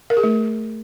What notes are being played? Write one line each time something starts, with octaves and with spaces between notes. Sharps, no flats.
A#4
G#4
A3